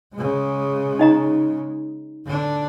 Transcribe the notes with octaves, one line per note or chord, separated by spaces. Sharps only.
C#3 G#3
D#4 D#5 A#5
D3 D4